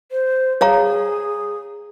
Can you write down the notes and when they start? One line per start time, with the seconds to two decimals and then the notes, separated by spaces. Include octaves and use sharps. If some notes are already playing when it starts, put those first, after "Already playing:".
0.11 C5
0.61 G#4 C#5 F5 A#5